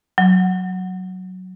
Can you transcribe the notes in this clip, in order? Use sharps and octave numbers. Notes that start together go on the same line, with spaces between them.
F#3